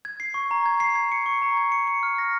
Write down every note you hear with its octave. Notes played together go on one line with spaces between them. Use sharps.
G#6
C7
C#6
A#5
G#6
C7
G#6
C#7
C#6
A#5
G#6
C#7
C#7
F6
A#6